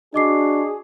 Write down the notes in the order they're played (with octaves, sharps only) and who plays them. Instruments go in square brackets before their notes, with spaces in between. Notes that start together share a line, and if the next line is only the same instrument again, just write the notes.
[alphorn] D4 [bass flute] F#4 [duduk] G#4 [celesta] D#5 D6 C7